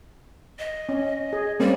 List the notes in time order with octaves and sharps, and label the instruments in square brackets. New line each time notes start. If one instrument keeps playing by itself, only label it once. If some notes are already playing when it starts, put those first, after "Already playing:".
[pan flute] D#5
[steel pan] C#4
G#4
[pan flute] G3 [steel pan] A#3 C4 C#4